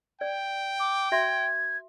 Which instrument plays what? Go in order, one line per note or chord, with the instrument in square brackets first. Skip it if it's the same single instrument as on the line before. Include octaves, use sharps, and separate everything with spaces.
[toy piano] D5 [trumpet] G5
[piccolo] D6
[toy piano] F#4 E5 C6 [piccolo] G#6